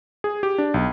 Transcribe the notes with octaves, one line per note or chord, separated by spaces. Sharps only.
G#4
G4
D4
B1